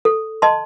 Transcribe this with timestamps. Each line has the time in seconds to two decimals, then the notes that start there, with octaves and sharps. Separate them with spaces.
0.05 A4
0.42 D#5 A5 C6